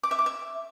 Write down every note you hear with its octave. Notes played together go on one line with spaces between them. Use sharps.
D6
E5
D6
E5